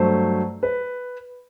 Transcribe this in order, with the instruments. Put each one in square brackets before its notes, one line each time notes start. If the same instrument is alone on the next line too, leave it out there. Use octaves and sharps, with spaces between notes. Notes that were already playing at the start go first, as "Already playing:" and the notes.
Already playing: [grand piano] G2 F#3 A3 C5
B4